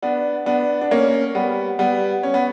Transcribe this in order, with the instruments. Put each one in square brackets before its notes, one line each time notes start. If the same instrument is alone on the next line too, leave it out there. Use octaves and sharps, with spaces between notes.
[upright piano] B3 D4
B3 D4
D4
A#3 C#4
G3 B3
G3 B3
C#4
B3